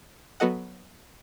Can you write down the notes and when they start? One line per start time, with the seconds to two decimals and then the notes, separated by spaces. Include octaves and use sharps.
0.40 F#3 B3 F#4 A4 D#5 F#5